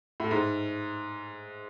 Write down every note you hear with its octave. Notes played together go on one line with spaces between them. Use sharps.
A2
G#2